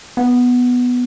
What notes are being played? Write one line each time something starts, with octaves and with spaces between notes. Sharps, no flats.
B3